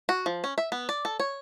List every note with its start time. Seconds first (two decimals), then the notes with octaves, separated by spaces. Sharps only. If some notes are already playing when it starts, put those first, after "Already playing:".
0.09 F#4
0.26 F3
0.44 C#4
0.58 E5
0.72 B3
0.89 D5
1.05 A4
1.20 C#5